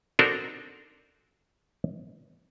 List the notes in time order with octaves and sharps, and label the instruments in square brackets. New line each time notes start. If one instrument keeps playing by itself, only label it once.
[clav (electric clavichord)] C4 D4 D#4 F#4 A4 A#4